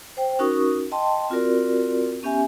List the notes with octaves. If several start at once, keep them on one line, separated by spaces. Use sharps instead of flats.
C5 G5
C#4 D#4 F#4 A#4 C#6 D#6
D#5 G5 A5 C6
C4 F4 F#4 A#4 D5
B3 C#4 G4 E5 G#5